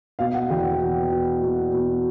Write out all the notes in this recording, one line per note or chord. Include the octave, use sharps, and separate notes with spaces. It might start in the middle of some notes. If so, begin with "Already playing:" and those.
B2 F5
F#5
E2 G5
B2
B2
B2
B2